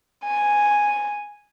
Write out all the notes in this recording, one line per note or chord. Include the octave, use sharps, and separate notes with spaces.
G#5